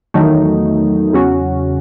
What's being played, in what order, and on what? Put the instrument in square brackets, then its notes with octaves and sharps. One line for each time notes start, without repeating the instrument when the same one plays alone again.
[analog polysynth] E2 D#3 F#3 A3 D#4
E2 C#3 F#3 C#4 F#4